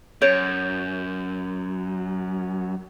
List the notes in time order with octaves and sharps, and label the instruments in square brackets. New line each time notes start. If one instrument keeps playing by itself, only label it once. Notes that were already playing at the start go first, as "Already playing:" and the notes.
[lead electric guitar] F#2 [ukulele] C#5 [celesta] G6 D7